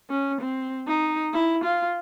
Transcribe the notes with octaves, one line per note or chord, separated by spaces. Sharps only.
C#4
C4
D#4
E4
F4